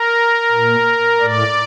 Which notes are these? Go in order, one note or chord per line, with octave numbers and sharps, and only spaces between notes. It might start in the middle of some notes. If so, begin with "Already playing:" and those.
Already playing: A#4
A#2
A2 D5